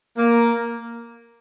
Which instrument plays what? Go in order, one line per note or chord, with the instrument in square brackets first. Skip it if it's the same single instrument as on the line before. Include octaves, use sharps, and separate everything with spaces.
[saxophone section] A#3